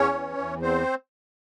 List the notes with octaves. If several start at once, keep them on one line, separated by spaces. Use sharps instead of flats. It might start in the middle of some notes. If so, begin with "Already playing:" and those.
Already playing: E2 C#4 C#5
E3
E2
C4 C5